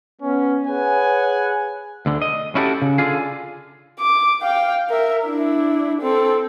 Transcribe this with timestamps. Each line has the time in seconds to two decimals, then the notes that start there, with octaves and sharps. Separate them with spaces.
0.22 B3 C#4
0.67 G#4 B4 C#5 F#5 G#5
2.06 D2 D3
2.22 D#5
2.55 C#4 E4 F#4 G4 A4
2.82 C#3
2.98 D3 F4 G#4
4.00 D6
4.42 F5 G5
4.90 A#4 E5
5.25 D4 E4
6.01 C4 A4